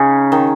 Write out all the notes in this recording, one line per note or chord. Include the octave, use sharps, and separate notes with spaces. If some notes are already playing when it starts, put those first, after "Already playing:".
Already playing: C#3 C#4 D#4
D#3